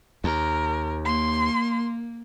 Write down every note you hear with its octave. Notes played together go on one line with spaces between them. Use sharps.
D#2 A#4
A#3 C6